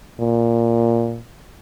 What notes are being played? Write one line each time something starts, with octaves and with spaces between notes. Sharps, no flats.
A#2